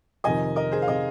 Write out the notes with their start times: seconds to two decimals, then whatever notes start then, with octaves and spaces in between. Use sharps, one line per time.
0.24 F2 C3 D#3 D#5 G#5
0.56 A#4 D#5
0.72 G#4 C5
0.82 F5
0.87 C3 D#3 A#4 D#5